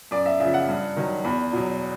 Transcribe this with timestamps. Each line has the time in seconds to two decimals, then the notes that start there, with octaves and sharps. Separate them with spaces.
0.11 F#2 D5
0.26 E5
0.40 C#3 F3 E5
0.54 F#5
0.68 G2
0.96 D#3 F#3
1.24 E2 B5
1.53 B2 F#3